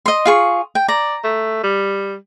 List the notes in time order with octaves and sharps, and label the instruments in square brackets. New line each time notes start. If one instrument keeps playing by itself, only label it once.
[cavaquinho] D#5 C6
F4 G#4 C#6
G5
[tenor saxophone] D5 [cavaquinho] A#5
[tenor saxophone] A3
G3